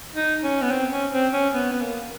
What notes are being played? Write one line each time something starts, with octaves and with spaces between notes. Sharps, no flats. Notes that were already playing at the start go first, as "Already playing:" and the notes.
D#4
C#4
B3
C4
C#4
C4
C#4
B3
B3
A#3